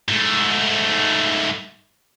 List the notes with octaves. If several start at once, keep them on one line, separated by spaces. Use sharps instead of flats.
G#2 A3